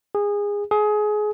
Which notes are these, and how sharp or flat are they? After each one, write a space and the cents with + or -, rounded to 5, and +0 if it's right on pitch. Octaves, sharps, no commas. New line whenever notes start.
G#4 -20
G#4 +25